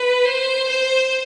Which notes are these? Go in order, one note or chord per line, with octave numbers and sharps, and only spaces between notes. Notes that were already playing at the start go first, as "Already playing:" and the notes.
Already playing: B4
C5
C5